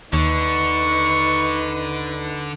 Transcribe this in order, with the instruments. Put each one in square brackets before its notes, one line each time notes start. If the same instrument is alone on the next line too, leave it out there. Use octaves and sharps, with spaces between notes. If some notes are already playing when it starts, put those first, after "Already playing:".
[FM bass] D#2 [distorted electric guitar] D3 [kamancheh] D#4 B4 [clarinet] C#6